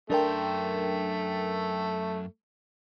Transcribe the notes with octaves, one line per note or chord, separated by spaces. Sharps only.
F#2 A3 D4 A#4 G5 C6